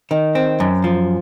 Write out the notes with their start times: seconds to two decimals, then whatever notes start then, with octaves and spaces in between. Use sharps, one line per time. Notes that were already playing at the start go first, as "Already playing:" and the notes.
0.11 D#3
0.35 C4
0.60 F#2
0.84 F3